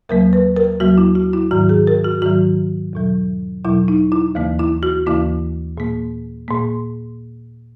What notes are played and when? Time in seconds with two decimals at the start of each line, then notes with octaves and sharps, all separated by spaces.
0.09 D#2 C#3 F#3 A#3 A#4
0.33 B4
0.57 A#4
0.80 D#2 C#3 F#3 A#3 F#4
0.98 E4
1.15 F#4
1.33 E4
1.51 G#2 D#3 F#3 F#4
1.69 G#4
1.87 A#4
2.04 F#4
2.22 G#2 D#3 F#3 F#4
2.93 E2 B2 F#3
3.64 E2 B2 F#3 E4
3.88 D#4
4.12 E4
4.35 D#2 C#3 E3 A#3
4.59 E4
4.83 F#4
5.06 D#2 C#3 E3 A#3 E4
5.78 A#2 A#3
6.48 A#2 A#3